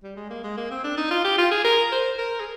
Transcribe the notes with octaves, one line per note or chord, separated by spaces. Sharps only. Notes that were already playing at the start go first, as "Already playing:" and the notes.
G3
G#3
A#3
G#3
A#3
C4
D4
D#4
F4
G4
F4
G#4
A#4
C5
A#4
G#4